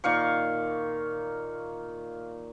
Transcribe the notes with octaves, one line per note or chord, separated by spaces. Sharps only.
A#2 D#3 F5 C#6